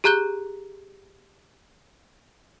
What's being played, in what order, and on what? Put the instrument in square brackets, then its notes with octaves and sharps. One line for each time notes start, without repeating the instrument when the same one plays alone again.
[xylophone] G4 G#4 A#5 F#6 G6 G7